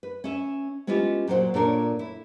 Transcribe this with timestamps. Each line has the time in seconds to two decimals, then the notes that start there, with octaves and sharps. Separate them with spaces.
0.03 B4
0.24 C#4 E5
0.87 G#3 B3 C#4 E4 F4 G4
1.28 A#2 F#3 F#4 G4 C5 F#5
1.54 A#2 D4 A4 A#4 C#5
1.99 E4